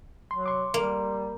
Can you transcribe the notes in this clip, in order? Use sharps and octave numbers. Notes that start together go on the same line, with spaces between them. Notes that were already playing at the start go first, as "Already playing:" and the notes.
F#3 C6
C6 D6
G3 A#3